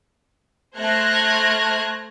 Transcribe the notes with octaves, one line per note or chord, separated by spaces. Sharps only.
A3 C5 F6 F#6 G#6 A#6